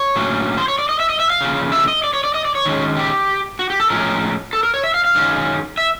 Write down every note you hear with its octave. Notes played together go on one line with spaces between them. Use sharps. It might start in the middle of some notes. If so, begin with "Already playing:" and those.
Already playing: C#5
A2 F#3 A#3 C#4
C5
C#5
D5
D#5
E5
D#5
E5
F5
C#3 F3 A#3
E5
D#5
D5
C#5
D5
D#5
D5
C#5
D#3 G#3 C#4
G4
F#4
G4
A4
A2 F3 G#3 C#4 A#4
A4
A#4
C#5
E5
F5
F5
F#2 D#3 G#3 C#4
E5